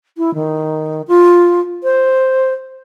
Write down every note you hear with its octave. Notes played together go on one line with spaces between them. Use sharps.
E4
D#3
F4
C5